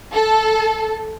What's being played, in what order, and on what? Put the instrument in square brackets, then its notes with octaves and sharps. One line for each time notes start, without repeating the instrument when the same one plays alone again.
[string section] A4